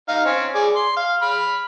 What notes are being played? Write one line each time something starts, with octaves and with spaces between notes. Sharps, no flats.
D#4 F5
C4 C#4
G#4 D5
C6
F5
B5 F6